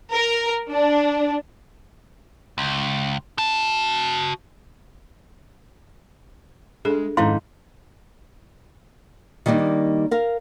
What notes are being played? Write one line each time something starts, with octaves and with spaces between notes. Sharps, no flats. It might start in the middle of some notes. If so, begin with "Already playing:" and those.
A#4
D4
C#2
F#4 A5
G#3 D4 G#4 A4
F2 G#2 D#3 C#4 D#4 E4 F5 C6
D#3 G3 A#3 D4 D#4
A#4 F5